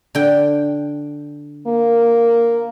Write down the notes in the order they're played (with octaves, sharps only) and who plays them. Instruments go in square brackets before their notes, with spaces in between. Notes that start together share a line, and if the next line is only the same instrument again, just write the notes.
[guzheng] D3 G5
[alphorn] A#3